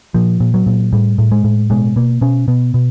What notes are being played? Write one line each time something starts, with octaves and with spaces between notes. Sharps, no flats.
A#2 F3
A#2
F#3
A#2
A2 G3
A2
G#3
A2
B2 G#3
B2 A#3
B2 C#4
B2 B3
B2